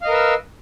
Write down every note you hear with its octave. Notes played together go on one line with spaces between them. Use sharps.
A#4 B4 D#5 F5 E6